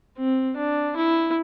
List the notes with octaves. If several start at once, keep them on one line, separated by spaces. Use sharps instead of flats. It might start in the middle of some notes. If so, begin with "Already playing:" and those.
C4
D4
E4